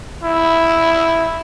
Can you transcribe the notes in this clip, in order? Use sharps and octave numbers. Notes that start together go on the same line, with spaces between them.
E4